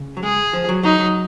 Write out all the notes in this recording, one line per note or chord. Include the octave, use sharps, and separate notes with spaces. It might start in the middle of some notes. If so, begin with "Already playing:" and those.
Already playing: C#3
F#3
G#3 G#4
F3
F#3
F#3 D#4
F#3